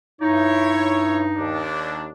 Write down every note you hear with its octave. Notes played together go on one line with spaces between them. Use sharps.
G2 D#4 E4 C#5
D#2 D4